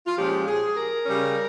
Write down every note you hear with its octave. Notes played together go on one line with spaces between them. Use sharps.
F4
A#2 F3 G#3 C#4 G4
G#4
A#4
C#3 G3 C#4